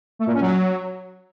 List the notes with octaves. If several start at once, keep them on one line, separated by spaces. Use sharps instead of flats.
A3
A#2
C#4
F#3